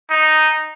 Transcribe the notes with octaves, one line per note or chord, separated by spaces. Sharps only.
D#4